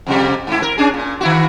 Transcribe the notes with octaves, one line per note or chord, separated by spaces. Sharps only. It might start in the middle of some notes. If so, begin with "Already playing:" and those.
F2 C3 G3
G#2 E4
A#4
C#4 D4 G#4
A#2
D#3 E4 F#4